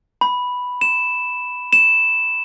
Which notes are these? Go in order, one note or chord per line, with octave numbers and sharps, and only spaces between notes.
B5
E7
E7